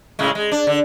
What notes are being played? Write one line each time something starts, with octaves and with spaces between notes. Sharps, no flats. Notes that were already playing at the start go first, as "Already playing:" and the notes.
A2 C#3 G#3
G#3
D4
D3